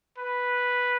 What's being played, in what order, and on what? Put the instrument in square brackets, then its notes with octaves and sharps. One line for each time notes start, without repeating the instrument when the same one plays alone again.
[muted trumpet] B4